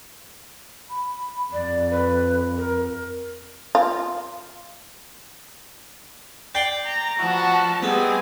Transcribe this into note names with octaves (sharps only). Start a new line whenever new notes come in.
B5
F2 D5
B4
A#4
F4
D5 G5 C6
A#5
F3 B3 F#4 A5
G3 B3 C4 G#4 D#5 G#5